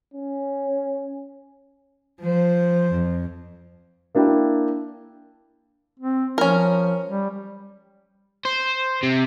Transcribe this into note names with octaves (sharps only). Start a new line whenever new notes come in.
C#4
F3 C5
F2
A#3 D4 E4 G5
C4
F3 C#4 A#4
G3
C5
C3